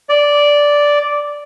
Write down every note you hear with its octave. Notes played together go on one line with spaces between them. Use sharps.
D5